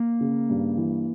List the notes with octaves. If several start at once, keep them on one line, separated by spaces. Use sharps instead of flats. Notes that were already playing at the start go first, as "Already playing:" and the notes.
Already playing: A#3
C#3
G2
E3